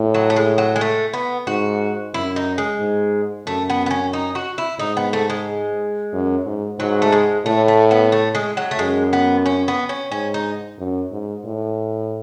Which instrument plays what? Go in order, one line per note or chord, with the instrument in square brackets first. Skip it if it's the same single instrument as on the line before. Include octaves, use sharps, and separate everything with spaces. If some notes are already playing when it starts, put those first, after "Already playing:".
Already playing: [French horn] A2
[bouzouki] F#3
A3
G#3
F#3
G#3
A3
B3
[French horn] G#2 [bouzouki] F#4
[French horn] F#2 [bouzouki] E4
[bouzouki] D#4
G#3
[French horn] G#2
[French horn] F#2 [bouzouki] A3
[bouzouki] B3
B3
C#4
D#4
F#4
E4
[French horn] G#2 [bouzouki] D#4
[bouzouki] B3
A3
G#3
[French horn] F#2
G#2
[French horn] G#2 [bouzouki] F#3
[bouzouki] A3
G#3
[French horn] A2 [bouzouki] A3
[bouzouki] A3
B3
A3
G#3
F#3
A3
[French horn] F#2 [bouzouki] G#3
[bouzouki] B3
C#4
B3
C#4
[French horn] G#2 [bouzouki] C#4
[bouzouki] D#4
[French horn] F#2
G#2
A2